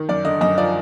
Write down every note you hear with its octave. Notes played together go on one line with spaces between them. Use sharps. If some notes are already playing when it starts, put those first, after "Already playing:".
Already playing: D#3
F#2 D5
D3 D#5
F#2 D#5
F3 D5